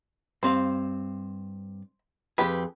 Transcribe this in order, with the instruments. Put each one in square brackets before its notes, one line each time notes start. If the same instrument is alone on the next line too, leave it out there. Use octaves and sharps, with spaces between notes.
[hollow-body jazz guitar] G2 C4 F5 [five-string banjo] C5
[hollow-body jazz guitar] F2 G#4 [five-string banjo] G4 B4